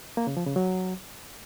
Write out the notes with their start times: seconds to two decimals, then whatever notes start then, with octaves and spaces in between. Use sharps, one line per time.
0.17 A#3
0.27 C#3
0.37 F3
0.46 C#3
0.56 F#3